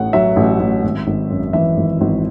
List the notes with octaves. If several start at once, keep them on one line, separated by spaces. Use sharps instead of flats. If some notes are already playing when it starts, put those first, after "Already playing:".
Already playing: A1 A2 F#5
F#3 E5
A1
A1
G#1
G#1
F#2
E3 E5
G#1
G#1